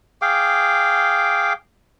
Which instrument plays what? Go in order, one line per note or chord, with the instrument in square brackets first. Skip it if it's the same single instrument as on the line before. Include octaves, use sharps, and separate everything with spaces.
[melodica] G#4 F5 G5 D6